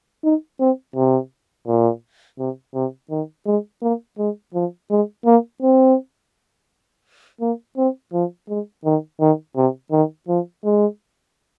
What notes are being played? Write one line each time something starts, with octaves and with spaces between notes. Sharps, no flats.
D#4
C4
C3
A#2
C3
C3
D#3
G#3
A#3
G#3
F3
G#3
A#3
C4
A#3
C4
F3
G#3
D#3
D#3
C3
D#3
F3
G#3